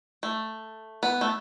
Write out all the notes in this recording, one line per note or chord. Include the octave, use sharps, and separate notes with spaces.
A3
B3
A3